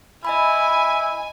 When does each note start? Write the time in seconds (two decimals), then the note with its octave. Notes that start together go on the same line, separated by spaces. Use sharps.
0.25 E4 D#5 G#5 B5